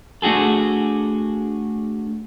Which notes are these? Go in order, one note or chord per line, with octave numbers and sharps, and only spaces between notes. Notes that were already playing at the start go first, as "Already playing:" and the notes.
A3 D4 F#4 G#4 A4